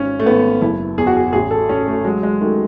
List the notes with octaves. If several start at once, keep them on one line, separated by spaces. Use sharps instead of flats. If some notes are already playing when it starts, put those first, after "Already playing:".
Already playing: G#1 C#4
A3
G#1 B3
F#1 E4
E2 G#4
F#4
G#4
A1 G#4
A4
A1 C#4
A3
F#3 G#3
G#3
D#3 A3